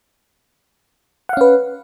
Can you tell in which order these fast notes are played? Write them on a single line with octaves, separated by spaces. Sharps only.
F#5 F5 C#4 B4